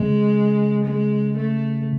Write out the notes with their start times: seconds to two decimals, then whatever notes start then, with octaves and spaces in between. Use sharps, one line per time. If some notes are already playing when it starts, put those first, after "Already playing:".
Already playing: C#3 G#3
0.85 G#3
1.37 A3